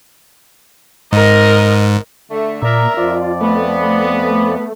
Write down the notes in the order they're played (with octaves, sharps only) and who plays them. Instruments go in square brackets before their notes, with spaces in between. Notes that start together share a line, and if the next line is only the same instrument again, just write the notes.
[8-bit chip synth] G#2 [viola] A#4 D#5
[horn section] D3 A3
[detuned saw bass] A#2 [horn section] A#4 E5 [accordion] D5 A#5
[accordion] F2 F3 D5 [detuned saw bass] F4
[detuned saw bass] A3 [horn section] B3